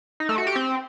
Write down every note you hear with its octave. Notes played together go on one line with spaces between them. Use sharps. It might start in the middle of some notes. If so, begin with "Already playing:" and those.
D#4
A3
F#4
G4
C4